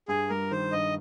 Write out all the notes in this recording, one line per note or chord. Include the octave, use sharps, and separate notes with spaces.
G2 G#4
G3 A#4
D#3 C5
G2 D#5